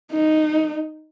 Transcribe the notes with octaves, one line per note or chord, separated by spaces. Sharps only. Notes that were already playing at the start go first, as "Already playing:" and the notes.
D#4